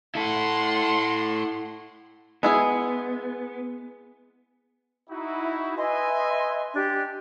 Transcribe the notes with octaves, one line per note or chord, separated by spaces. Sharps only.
E4 A4 F#5 C6
G#3 B3 E4 G#4
D#4 E4 F#4
B4 D#5 E5 G#5 C6
D4 G4